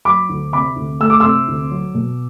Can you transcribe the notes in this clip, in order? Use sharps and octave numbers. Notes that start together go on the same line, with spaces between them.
F#3 B5 D6
D2
C3 B5 D6
D2
A3 E6
D6
C3 C6 E6
D2
F#3
B2